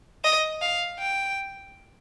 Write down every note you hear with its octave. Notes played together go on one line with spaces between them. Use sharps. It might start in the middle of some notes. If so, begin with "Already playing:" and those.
D#5
F5
G5